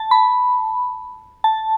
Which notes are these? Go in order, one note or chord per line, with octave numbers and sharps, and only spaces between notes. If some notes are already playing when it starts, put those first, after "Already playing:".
Already playing: A5
B5
A5